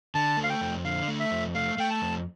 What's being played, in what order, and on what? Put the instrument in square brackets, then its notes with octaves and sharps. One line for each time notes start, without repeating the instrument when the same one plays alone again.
[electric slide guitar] D3 [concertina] A5
[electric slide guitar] A3
[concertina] F5
G5
[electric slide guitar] F2
[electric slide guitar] D3 [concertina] F5
[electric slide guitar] A3
[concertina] E5
[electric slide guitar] F2
[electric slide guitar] A3 [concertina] F5
[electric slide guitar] A3 [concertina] G5
[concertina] A5
[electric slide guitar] F2